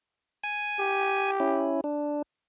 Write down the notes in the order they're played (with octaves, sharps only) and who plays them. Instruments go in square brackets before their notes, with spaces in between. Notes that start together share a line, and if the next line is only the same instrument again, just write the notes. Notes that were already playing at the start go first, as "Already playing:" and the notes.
[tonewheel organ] G#5
[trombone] G4
[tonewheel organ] C#4 E4
D4